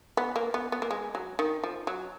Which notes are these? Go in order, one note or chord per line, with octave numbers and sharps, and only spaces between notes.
B3
A#3
B3
B3
A#3
G#3
F#3
D#3
F3
F#3